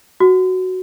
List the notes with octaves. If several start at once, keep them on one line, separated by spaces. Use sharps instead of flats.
F#4